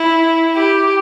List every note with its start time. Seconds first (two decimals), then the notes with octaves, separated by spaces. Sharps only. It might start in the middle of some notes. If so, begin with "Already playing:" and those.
Already playing: E4
0.56 G4